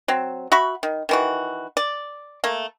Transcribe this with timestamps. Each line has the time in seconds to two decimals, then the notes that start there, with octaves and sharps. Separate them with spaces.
0.08 F#3 C4
0.52 F#4 E5 B5 C#6
0.83 D#3
1.09 D#3 E3 F#4
1.77 D5
2.44 A3 A#3